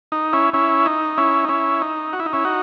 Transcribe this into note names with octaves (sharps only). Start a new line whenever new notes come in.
D#4
C#4 E4
C#4 E4
D#4
C#4 E4
D#4
C#4 E4
D#4
F#4
E4
D#4
C#4 E4
D#4 F#4